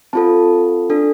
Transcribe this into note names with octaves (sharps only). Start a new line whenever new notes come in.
C4 F4 A4 A5
D4 A4